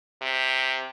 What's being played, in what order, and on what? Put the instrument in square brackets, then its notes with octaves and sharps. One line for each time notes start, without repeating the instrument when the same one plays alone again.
[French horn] C3